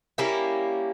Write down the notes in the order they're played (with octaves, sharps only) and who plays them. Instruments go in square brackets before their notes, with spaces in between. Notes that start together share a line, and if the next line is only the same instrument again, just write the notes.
[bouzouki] G3 A#3 C#4 E4